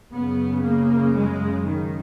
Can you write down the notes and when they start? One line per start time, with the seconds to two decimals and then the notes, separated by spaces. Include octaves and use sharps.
0.13 F#2 C#3 B3
0.64 A#3
1.15 G#3
1.66 D#3